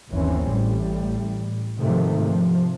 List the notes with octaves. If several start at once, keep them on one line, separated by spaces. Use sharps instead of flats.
G1 D#2 E3 C4 C#4
A1 A2 G3
G#2 C3 D#3 F3 A3
C3 F3